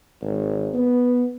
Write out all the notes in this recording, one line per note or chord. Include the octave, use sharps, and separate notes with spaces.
G#1
B3